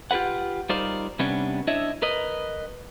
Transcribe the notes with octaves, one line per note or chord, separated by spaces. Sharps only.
F4 G4 A#4 B4 F#5
G3 D#4 F4 A#4 C5 D5
C3 G3 B3 C#4 D4
D4 E4 C#5 D#5 E5
A#4 B4 D#5